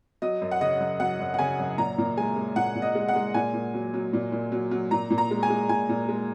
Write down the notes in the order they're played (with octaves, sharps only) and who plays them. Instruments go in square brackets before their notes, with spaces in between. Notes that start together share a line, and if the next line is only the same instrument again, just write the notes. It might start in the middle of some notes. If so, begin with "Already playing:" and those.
[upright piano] F#3 D#5
F#2
F#5
C#3 D#5
F#2
F#3 F#5
F#2
F#5
C#3 G#5
F#2
A#2 A#5
A#2
G#3 G#5
G#3
A#2 F#5
A#2
D#5
G#3
F#5
G#3
A#2 G#5
A#2
F#3
F#3
A#2
A#2
F#3
F#3
A#2 A#5
A#2
A#5
G#3
G#5
G#3
A#2 G#5
A#2
G#3